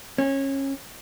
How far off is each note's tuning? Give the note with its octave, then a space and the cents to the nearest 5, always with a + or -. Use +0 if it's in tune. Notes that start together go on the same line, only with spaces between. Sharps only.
C#4 -25